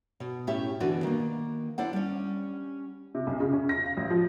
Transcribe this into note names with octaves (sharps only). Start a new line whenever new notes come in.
B2
A2 C#4 E4 G4 E5
D2 B2 E3 D4 F#4 B4
D#3 A#3
D4 E4 C5 F#5
G3 C#4
C3
B1
C#3
C#4
A#6
F5
A1
F3